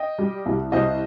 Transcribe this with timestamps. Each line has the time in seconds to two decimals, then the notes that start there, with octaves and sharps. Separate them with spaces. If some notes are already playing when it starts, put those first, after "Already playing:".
Already playing: D#5 G5
0.19 G3
0.46 C2
0.72 C2 C5 D#5